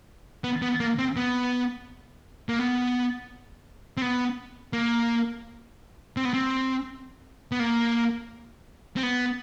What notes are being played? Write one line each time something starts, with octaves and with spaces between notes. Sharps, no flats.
B3
B3
A#3
C4
B3
A#3
B3
C4
B3
A#3
C4
B3
C4
B3
A#3
C4
B3